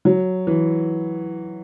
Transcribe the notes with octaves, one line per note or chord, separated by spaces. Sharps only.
F#3
E3